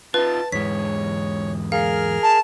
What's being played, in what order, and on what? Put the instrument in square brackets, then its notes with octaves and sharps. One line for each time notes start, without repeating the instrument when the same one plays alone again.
[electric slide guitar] D#4 F4 [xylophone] B4 [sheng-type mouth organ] A5
[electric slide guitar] E2 G#2 G#3 [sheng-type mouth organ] C#5 [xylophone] B6
[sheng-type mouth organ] G#4 A#4 F6 [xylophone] F5
[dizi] A5